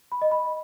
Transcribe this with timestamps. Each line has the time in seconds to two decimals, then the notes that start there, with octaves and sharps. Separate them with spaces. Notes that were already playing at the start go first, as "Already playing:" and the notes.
0.12 B5
0.22 D#5
0.31 B5